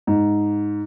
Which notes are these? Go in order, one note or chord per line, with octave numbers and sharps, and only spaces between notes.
G#2